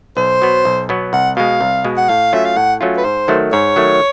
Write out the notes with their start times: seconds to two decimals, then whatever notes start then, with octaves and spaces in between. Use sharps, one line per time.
0.17 B1 C5
0.41 B2 F#3 B3
0.65 B1
0.89 B2 F#3 B3
1.13 C2 F#5
1.37 B2 G#3 F5
1.61 C2
1.84 B2 G#3
1.97 F#5
2.09 A2 F5
2.33 F#3 A3 C#4 F4 E5
2.45 F5
2.57 A2 F#5
2.81 F#3 A3 C#4 F4
2.97 B4
3.04 G#2 C5
3.28 D#3 F#3 A3
3.52 G#2 C#5
3.76 D#3 F#3 A3